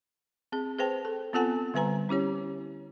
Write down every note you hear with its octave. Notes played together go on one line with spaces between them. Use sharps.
C4 G#4
G#4 B4 C5 G5 A5
A4
B3 C4 F4 A4 F#5 G#5
D3 G3 B4 G#5 A#5
C#4 E4 G4 C#5